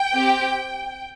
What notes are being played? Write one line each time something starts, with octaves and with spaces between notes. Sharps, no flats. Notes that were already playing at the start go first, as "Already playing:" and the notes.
Already playing: G5
C4 G4